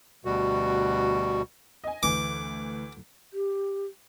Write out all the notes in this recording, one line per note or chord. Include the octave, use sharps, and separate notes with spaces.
D2 B2 G3 F#4
D#5 G#5
D2 E3 D6
G4